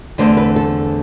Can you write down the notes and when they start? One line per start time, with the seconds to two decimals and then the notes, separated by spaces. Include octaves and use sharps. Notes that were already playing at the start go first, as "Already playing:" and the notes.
0.18 E2 D3 A3 C4 C5
0.37 B4
0.56 A4